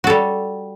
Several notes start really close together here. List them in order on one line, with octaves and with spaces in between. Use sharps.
F#4 A4 G3